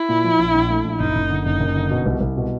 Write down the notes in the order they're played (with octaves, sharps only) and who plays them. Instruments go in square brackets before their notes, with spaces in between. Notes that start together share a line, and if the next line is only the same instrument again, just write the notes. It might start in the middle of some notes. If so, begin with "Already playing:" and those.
Already playing: [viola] E4
[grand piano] A#2
F3
A#1
A#1
A3
A#1
[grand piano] F#1 [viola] D#4
[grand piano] F#1
D3
[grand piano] F#1 [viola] D#4
[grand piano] F#1
D3
B2
C2
C2
B2